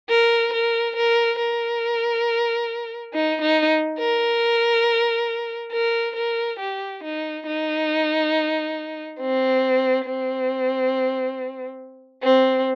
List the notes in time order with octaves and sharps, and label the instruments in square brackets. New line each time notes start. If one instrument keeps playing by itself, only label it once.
[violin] A#4
A#4
A#4
A#4
D#4
D#4
A#4
A#4
A#4
G4
D#4
D#4
C4
C4
C4